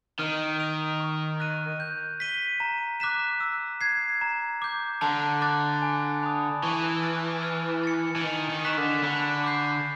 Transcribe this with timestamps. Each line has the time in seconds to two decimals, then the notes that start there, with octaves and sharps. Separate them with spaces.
0.19 D#3 F6
0.60 A#6 D7 F7
1.00 C#6
1.40 F#6 A#6 D#7
1.80 G6
2.20 B6 D#7 G7
2.60 A#5
3.00 D6 F#6 B6 E7
3.40 E6
3.81 G#6 C7
4.21 A#5
4.62 D6 G6
5.02 D3 A5
5.42 D6 F#6 A6
5.82 G#5
6.23 B5 D#6
6.63 E3 C#6
7.02 F6 A6 D7
7.43 F6
7.84 A6 C#7
8.16 E3
8.23 D#3 G#5
8.50 D#3
8.64 C#6 F#6 B6 E7
8.78 D3
9.04 D3 B5
9.44 D6 G6 C7